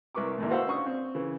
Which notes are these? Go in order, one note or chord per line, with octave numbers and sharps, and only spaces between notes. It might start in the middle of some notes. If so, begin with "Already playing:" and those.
C2 A#4 B4 C#6 D6
A1 D#2 A2
F#4 B4 C5 F5 F#5 E6
C#4 D4 C#6 D#6
C4
C#3 E3